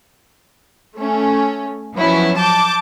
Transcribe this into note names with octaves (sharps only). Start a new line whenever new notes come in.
A3 C#4
F3 F#3 B3 C#4 E4
A5 D6 G6